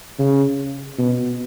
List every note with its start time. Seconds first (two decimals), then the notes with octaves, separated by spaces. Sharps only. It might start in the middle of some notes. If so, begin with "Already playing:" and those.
0.19 C#3
0.98 B2